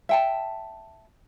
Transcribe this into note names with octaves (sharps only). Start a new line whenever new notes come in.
E5 G5 A5